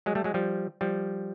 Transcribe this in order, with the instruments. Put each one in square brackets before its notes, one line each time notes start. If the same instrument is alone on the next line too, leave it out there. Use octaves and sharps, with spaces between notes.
[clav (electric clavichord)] F#3 G#3
G3 A3
F#3 G#3
F3 G3
F3 G3